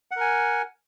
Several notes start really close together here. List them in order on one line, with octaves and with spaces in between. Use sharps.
F#5 A#4 G#5